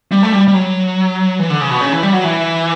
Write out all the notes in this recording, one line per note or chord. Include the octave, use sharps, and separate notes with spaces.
G3
A3
G3
G3
F#3
E3
D3
C#3
B2
C#3
E3
G3
F#3
E3